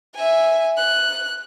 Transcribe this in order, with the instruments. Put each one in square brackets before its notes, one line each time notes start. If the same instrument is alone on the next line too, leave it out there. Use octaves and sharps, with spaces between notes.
[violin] E5 G#5
F#6